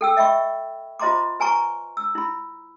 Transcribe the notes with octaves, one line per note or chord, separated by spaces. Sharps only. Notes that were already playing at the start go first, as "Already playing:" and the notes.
A4 G5 E6
D#5 E5 G5 B5 C#6
F4 C5 D#5 A#5 C6 D6
B4 G#5 A#5 C#6
E6
E4 B5